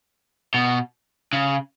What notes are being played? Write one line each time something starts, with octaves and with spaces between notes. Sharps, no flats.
B2
C#3